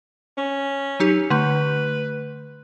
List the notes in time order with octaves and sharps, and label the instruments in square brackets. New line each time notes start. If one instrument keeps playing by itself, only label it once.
[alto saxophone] C#4
[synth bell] F#3 D#4 G4
[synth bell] D3 A3 [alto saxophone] B4